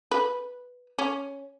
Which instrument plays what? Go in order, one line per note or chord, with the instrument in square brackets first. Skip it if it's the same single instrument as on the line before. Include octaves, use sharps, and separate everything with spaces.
[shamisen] B4
C#4